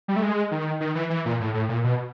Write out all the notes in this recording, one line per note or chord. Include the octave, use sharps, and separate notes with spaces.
G3
A3
G#3
D#3
D#3
E3
E3
A#2
A2
A2
A#2
B2